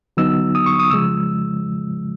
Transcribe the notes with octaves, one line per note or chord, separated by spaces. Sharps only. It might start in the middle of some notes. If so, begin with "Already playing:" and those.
D3 F#3 B3 D#4 E6
D#6
C#6
D#6
C#3 F3 G#3 E6